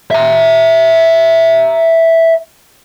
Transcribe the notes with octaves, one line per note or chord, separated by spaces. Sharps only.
E5 A#5